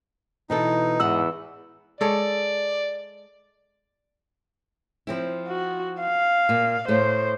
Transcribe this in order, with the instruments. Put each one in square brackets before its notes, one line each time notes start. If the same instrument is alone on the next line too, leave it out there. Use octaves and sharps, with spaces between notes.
[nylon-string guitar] B2 E3 A4 [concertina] D#4
[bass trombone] E2 [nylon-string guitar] G#2 D#5 F#5 [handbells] E6
[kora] G#3 A4 C#5 [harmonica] D5
[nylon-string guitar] F3 C4 E4
[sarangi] F#4
F5
[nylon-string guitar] A#2
[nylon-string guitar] A2 A3 [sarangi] C5